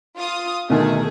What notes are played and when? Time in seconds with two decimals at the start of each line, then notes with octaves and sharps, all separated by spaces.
0.17 F4 F5 D#6
0.70 D2 B2 D#3 A3 G#4 A#4